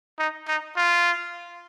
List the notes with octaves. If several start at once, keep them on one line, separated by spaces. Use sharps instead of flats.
D#4
D#4
F4